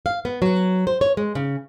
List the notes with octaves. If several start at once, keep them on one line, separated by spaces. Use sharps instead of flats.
F5
B3
F#3
C5
C#5
G#3
C#3